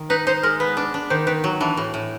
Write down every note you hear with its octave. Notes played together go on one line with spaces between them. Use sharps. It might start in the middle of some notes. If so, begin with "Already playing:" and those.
Already playing: D#3
D#4 B4
D#4 C5
G#3 A#4
B3 B4
D4
D4
D#3 C5
D#3 B4
F#3 F#4
E3 D4
A2
A2